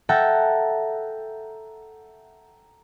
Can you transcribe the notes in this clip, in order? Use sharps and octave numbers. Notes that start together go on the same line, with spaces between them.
A4 E5 F#5 G5 A5 A#5